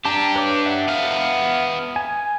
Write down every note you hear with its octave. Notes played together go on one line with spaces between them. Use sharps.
D4 G4 A5 A#5
B4 C#5 D6
E5 F#5
B3 F5
G#5